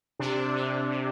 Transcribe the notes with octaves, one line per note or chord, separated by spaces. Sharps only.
C3 D4
C3
C3